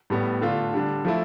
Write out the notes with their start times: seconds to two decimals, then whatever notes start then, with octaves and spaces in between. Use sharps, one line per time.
0.10 A2 G3 B3
0.42 D3 A3 D4 F4
0.74 D3 G3 D4
1.05 F3 A3 E4